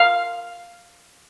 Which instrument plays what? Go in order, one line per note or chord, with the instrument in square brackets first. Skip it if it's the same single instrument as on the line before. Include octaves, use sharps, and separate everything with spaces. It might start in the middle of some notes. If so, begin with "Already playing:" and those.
Already playing: [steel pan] F5